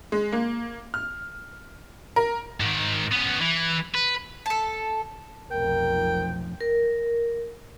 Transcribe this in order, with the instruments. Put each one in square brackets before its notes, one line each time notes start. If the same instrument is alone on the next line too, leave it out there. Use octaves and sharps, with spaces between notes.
[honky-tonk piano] G#3
A#3
F6
A#4
[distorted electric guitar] G#2 D#3
B3 C#4
E3
B4
[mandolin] A4 A5
[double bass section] F1 B1 F3 [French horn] A#4 [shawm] G5
[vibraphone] A#4